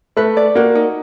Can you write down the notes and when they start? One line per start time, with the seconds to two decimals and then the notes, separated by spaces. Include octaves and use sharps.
0.17 A3 B4
0.37 D5
0.55 A#3 F#4
0.75 D#4